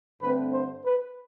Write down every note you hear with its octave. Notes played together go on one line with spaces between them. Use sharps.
G2 D3 A3 C4 B4
C5
B4